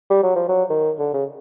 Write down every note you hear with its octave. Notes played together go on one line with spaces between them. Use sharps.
G3
F#3
F3
F#3
D#3
D3
C#3